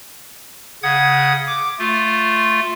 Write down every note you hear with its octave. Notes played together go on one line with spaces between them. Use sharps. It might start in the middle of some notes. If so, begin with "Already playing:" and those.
C#3 F#5 D#6 G#6
D6
A3 F4